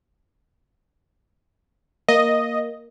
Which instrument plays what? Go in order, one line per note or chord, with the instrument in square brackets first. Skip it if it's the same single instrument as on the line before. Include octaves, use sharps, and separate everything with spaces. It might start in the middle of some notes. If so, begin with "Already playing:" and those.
[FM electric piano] A#3 [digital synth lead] D#5